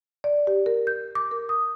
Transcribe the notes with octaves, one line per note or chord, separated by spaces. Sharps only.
D5
G4
A#4
G6
D6
A#4
D#6